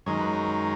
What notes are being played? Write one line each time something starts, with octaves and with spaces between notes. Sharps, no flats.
F#2 D#3 G#3 C#5
B4